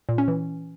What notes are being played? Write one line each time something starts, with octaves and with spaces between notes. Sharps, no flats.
A#2
C#4
E3